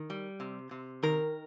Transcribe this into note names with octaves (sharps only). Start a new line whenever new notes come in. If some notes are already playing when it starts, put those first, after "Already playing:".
Already playing: D#3
G3
C3
C3
D#3 A#4